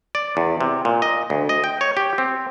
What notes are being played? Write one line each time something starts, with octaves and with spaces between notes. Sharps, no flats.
D5
E2
C3
A#2
D#5
D2
D#5
G5
C#5
G4
C4